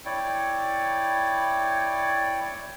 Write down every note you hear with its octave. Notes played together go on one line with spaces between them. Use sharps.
E4 C#5 D5 G5